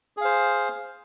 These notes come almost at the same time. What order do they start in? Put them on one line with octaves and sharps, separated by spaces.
G#4 F5 C5